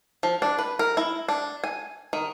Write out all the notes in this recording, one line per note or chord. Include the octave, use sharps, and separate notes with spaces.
F3
D4
B4
A#4
E4
D4
G#5
D#3